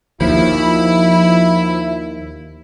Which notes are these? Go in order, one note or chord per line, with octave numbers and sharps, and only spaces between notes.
D#2 F3 E4